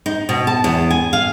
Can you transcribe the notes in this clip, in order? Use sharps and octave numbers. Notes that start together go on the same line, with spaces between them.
D#4
B2
A5
E2
G#5
F5